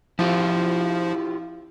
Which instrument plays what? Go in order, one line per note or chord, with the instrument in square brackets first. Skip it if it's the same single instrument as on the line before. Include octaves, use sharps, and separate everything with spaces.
[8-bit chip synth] F3 [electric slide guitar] E4 F4 G4